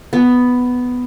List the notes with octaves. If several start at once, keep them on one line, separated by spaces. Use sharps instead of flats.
B3